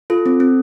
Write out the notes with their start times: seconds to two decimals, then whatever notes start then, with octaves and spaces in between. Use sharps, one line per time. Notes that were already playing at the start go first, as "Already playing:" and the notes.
0.10 F4 A4
0.26 C4
0.40 C4